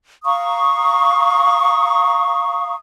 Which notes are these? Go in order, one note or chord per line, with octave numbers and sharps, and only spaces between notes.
F5 A#5 C#6 D#6